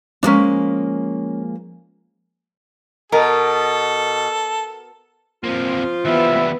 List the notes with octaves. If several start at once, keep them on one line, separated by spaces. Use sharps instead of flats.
F3 G#3 A#3 C#4 D4
B2 A4 A#4
C3 F3 A#3 F4
E3 G3 B3 E5